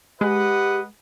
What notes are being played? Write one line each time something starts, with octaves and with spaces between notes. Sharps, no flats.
G#3 G4 B4 D#5 F#5